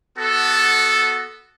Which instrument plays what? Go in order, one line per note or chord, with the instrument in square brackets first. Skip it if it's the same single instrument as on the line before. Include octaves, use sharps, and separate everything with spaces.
[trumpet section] B3 F#4 A4